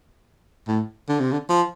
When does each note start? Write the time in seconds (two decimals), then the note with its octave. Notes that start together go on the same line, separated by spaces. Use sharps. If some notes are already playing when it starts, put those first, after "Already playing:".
0.68 A2
1.09 D3
1.20 C3
1.32 D3
1.49 F3